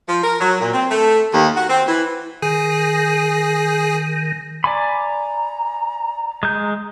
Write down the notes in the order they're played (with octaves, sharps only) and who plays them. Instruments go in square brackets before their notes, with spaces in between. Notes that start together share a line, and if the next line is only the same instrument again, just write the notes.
[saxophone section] F3
A#4
F#3
A#2
C4
A3
D#2
F#4
C4
E3
[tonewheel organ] D#3 [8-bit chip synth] G#4
[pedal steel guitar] D5 G#5 B5 [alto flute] A#5
[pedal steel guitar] G#3 G6